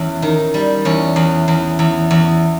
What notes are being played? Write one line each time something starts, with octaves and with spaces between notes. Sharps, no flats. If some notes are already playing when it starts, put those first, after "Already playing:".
Already playing: E2 C#4
D#3
G3
E2 C#4
E2
E2
E2
E2